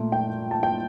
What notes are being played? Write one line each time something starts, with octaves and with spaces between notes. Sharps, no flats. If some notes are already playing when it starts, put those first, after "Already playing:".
Already playing: A#2 A3
G5
A5
G5